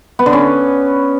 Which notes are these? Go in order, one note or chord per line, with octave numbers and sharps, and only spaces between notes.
B3
D3
C#4